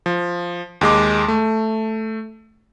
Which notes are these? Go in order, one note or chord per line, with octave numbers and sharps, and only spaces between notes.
F3
D#2 G#3 D6
A3